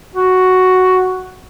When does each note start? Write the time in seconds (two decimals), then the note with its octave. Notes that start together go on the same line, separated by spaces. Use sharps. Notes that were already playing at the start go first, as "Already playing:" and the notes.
0.15 F#4